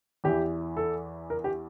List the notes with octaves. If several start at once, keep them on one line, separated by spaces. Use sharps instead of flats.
E2 E3 G4
A4
A#4
G4